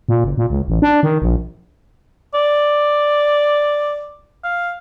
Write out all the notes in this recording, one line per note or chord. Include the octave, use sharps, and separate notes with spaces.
A#2
F#1
A#2
C#2
A1
D4
D#3
A#1
D5
F5